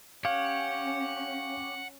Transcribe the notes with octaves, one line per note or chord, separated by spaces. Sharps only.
C#4 G4 C#5 F5 F#5